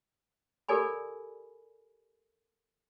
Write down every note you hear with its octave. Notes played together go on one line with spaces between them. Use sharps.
G4 A4 A#4 D5 G#5 B5